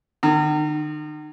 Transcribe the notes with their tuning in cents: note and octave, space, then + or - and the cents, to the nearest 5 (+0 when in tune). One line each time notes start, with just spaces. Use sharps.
D#3 -45